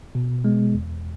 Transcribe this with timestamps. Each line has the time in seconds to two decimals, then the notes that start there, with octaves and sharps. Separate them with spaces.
0.15 B2
0.45 G#3 B3
0.74 E2